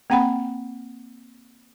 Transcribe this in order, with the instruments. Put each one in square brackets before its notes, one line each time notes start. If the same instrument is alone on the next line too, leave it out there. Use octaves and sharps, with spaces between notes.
[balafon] A#3 C4 F#5 G5 B5